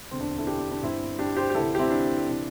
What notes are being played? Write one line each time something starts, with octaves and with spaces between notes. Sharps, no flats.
E1 D2 D3 C4
D4
E4 A4
D4 G4
D4
D4
G1 G2 D3 C4 E4
D4 G4
G4 C5
G4
D2 C3 E3 E4 A4
G4
C4 E4
D4
C3 E3